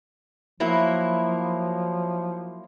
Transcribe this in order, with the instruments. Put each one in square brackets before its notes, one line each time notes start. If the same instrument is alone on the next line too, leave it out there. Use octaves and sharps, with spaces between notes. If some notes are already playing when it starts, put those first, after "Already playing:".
[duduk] F3 [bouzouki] F#3 A#3 E4